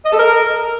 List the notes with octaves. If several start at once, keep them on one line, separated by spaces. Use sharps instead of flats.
D#5
A4
A#4